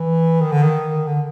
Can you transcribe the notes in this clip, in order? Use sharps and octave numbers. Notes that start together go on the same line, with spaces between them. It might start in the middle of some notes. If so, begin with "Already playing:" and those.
Already playing: E3
D#3
D3
D#3
D3